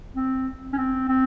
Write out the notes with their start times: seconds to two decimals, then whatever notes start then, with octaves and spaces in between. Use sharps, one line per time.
0.16 C4
0.73 C#4
0.77 C4
1.09 C4